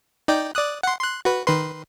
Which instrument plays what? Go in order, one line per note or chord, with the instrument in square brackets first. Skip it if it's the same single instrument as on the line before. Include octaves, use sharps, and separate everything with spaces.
[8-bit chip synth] D#4 D5 G5
D5 D#6 F#6
F#5 C6
C6 F#6
F#4 B4
D#3 B4 C6